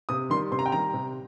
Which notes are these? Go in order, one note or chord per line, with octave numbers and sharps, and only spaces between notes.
C3 D#6
D#3 G3 C6
C3 C6
A#5
G5
D#3 G3 A#5
C3